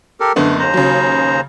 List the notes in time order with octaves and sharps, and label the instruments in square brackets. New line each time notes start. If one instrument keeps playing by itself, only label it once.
[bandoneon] G4 A4 A#4
[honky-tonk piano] F#1 D3 B3 [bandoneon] A3
[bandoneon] D#2 C5 A#5
[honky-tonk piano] C#3 F#3